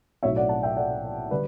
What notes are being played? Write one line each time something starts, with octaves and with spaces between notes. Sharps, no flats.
B1 A2 F#3 C#5 E5
D5 F#5
F#5 A5
E5 G5
D5 F#5
D3 G3 B4 D5